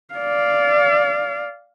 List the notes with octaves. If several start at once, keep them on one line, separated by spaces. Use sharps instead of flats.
D5 F5